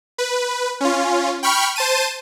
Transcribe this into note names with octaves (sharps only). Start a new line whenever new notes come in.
B4
C#4 F4
G5 B5 C#6 F6
C5 A5 D#7